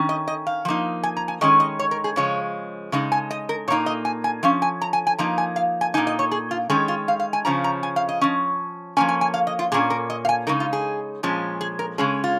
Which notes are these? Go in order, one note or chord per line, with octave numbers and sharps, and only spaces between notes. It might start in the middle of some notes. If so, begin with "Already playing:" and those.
Already playing: D#3 C#4
D#5
D#5
F5
F3 A#3 D#4
G#5
A#5
G#5
D#3 G#3 C#4 D#5
D#5
C#5
A#4
G#4
C#3 F3 G#3 C#5
C#3 G#3 D#4
G#5
D#5
A#4
A#2 A#3 D#4 C#5
D#5
G#5
G#5
F3 C#4 F5
G#5
A#5
G#5
G#5
F3 A#3 D#4 A#5
G#5
F5
G#5
A#2 A#3 D#4 G#5
D#5
C#5
G#4
F4
D#3 G#3 C#4 G#4
F4
F5
F5
G#5
C#3 F3 C#4 A#5
A#5
G#5
F5
D#5
F3 C#4
F3 A#3 C#4 G#5
G#5
G#5
F5
D#5
F4
A#2 A#3 C#4 G#4
A#4
D#5
F5
G#5
C#3 G#3 D#4 A#4
F4
G#4
A#2 F3 G#3 C#4
G#4
A#4
C#3 G#3 C#4 G#4
F4